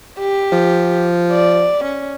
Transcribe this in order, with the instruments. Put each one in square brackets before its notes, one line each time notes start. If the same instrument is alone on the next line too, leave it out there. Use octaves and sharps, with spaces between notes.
[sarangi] G4
[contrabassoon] F3
[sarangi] D5
C#4